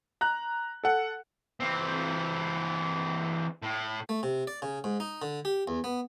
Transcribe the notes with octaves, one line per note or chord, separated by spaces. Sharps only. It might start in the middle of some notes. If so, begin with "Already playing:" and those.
A#5 F#6
A4 F#5
E3 C4
A2
A3
C3
D5
C#3
G#2
D#4
D3
G4
E2
B3